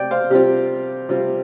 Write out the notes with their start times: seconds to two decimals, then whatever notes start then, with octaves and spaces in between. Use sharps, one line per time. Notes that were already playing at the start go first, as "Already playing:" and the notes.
Already playing: C3 C4 D5 G5
0.11 C5 F5
0.30 C3 G3 C4 F4 G4
1.09 C3 G3 C4 F4